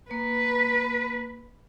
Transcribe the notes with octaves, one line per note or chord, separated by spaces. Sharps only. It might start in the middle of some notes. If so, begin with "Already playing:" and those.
A#3 B4